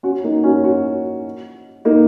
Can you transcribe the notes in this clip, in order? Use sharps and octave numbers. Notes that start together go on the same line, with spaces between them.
C#4 F#4
A#3 D#4
C#4 F#4
C#4 F#4
A#3 D#4